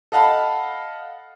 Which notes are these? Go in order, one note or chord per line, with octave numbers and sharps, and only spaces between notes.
A4 D#5 F5 F#5 A5 B5